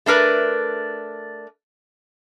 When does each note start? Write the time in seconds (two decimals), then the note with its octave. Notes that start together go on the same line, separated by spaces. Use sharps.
0.06 A3 D4 A#4 B4